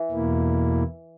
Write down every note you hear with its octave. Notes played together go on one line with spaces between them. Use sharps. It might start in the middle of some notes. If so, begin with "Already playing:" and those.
Already playing: E3
E2 B2 A#3 E4